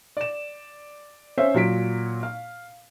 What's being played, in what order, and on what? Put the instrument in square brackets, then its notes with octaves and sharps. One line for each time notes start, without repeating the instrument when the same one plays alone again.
[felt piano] D5 E7
C#4 C5 C#5 E5
A#2 F#3 B6 D7
F5